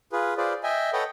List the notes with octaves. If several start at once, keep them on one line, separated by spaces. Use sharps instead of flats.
F4 G#4 B4
F4 G#4 B4 C5 D5
D#5 E5 G5 G#5
A4 B4 C#5 D#5 F#5 G5